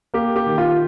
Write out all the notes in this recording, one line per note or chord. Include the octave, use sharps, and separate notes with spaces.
A#3 G4
G4
D#3
F4